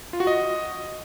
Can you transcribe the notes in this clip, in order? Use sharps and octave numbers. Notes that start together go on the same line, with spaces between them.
F4
F#4
D#5